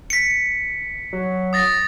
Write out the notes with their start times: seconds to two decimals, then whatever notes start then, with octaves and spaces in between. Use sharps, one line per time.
0.10 B6 C#7
1.13 F#3
1.53 D#6 A6 A#6